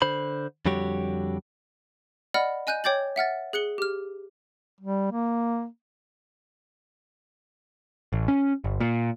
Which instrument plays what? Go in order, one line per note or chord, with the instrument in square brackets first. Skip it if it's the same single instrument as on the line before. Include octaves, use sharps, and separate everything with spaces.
[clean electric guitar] D3 C5 B5
F2 D3 G3 F#4 G4 C#5
[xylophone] D5 D#5 F#5 B5 F6
D#5 G#5 F#6 G6 D#7
C#5 G5 D6 G6 A6 F#7
E5 F#5 F6 A6
G#4 F#6 C#7 G7
G4 F6
[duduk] G3
A#3
[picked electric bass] A1
C#4
G1
A#2